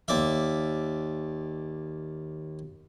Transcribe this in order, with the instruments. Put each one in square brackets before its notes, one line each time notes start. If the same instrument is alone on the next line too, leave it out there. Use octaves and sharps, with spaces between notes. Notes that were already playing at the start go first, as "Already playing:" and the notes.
[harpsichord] D#2 D5 E5